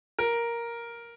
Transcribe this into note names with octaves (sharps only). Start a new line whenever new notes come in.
A#4